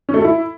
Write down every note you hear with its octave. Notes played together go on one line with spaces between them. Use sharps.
C#4
A3
A4
E4